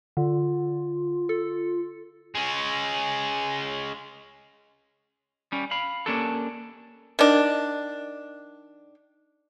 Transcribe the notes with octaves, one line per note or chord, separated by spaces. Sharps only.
D3 F4
A4
G#3 C#4
G3 C#4
F5 B5
A#3 C#4 D4 G4 A4
D#3 D4